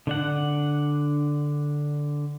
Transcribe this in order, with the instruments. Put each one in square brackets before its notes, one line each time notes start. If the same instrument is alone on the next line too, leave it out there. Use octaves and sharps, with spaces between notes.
[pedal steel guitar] D3 D4 F#5